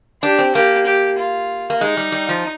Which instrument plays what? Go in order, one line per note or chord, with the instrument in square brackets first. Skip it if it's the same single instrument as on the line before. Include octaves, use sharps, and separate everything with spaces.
[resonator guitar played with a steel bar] D4 [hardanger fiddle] G4
[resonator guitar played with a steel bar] C4
[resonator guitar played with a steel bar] A#3 [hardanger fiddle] G4
[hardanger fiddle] G4
F4
[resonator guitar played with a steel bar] A#3
[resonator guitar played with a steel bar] G#3 [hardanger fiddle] D#4
[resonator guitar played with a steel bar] G3
G3
F3